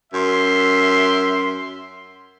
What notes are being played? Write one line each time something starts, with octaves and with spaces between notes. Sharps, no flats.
F#2 E5 C6